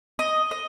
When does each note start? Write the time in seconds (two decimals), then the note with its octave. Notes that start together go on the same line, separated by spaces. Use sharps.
0.19 D#5
0.51 D#5